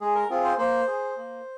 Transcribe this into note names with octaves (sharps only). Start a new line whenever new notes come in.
G#3 G#4
A#4
C4 F4 G#4
C5
A#3 C5
G#4
A#3